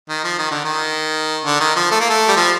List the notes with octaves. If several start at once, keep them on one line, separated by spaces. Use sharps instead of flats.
D#3
F3
D#3
D3
D#3
D3
D#3
F3
A3
A#3
A3
G3
F3